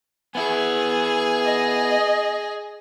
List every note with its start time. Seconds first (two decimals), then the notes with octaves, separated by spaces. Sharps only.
0.35 B3 E4 G#4
1.45 D#5